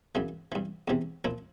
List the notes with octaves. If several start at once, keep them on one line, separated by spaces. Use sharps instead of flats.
F#2 C#3 E3
G2 E3
E2 C3 E3
A#2 F3 E4